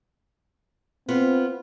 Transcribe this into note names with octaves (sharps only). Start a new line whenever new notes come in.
B3 C4 F4